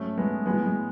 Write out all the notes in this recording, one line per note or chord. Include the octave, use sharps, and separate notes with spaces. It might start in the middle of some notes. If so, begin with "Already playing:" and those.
Already playing: G#2 F#3 A3 C#4
G#3 B3
A2 F#3 G#3 B3
G#3